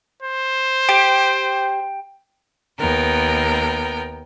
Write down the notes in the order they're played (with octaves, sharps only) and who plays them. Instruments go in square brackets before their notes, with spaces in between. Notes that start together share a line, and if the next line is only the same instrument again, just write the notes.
[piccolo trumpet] C5
[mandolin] G4 [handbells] G5
[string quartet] D#2 B3 A#4 G5